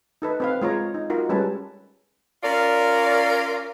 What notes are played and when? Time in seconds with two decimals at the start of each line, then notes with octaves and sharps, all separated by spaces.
0.22 D#4 A4 B4
0.40 C4 B4 F5
0.62 G#3 F4 C#5 A#5
0.94 D#4
1.10 D#4 F4 F#4 A#4
1.29 G3 G#3 C#4 B4 A5
2.43 C#4 F4 A#4 D5